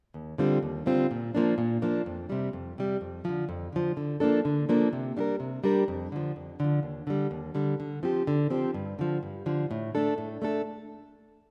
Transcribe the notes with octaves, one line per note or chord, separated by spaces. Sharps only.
D#2
D3 G3 C4 F4
D#2
D3 G3 C4 F4
A#2
F3 A#3 D4
A#2
F3 A#3 D4
F2
C3 G3
F2
C3 G3
F2
D3 F3
F2
D3 F3
D3
F3 A#3 D4 A4
D3
F3 A#3 D4 A4
C3
G3 D4 G4 A#4
C3
G3 D4 G4 A#4
F2
D3 F3
F2
D3 F3
D#2
D3 G3
D#2
D3 G3
D3
F3 C4 G4
D3
F3 C4 G4
G2
D3 F3
G2
D3 F3
A2
A3 D4 A4
A2
A3 D4 A4